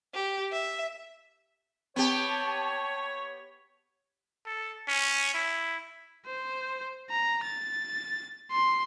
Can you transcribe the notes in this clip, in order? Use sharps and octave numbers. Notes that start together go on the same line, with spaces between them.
G4
E5
B3 C4 G4 C#5 A5
A4
C#4
E4
C5
A#5
A6
C6